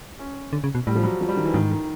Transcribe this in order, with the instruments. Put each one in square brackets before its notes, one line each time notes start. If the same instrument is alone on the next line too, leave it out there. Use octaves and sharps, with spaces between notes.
[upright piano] C#4
[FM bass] D3
C#3
B2
[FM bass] A2 [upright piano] G3
[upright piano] F3
F#3
F3
G3
D#3
E3
[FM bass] G#2 [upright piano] D#3
[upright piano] D#3